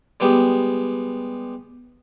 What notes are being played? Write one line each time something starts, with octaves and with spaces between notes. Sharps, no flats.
G3 G#3 B3 G4